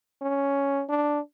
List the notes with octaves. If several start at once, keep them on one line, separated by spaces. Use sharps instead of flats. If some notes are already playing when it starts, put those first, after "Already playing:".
C#4
D4